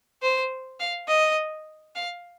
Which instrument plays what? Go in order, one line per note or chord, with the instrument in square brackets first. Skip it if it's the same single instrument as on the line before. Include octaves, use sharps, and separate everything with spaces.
[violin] C5
F5
D#5
F5